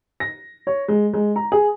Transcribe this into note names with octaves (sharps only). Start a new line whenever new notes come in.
A#6
C#5
G#3
G#3
A#5
G#4